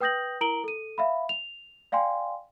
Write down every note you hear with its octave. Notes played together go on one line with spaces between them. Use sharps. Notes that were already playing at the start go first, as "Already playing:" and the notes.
B4 G5 D#6 G6 A#6 F#7
E4 A#4 A#5 D7 F#7 G7
A4 D#7
E5 F5 B5
F7
D5 F5 G5 G#5 C6